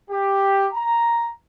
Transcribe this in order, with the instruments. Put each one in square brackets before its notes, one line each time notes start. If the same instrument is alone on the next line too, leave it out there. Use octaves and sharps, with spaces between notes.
[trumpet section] G4
A#5